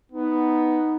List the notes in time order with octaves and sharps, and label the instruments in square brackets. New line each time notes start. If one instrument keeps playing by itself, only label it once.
[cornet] B3 [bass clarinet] D#4